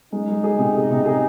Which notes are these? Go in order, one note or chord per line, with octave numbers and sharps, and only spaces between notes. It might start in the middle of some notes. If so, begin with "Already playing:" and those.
G#3 D#4
G#3
G#4
C3
G#4
C3
G#4